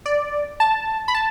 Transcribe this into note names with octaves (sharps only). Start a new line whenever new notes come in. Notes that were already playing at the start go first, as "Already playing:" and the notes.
D5
A5
B5
A5